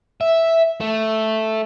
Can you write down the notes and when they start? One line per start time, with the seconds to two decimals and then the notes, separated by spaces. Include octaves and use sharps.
0.21 E5
0.81 A3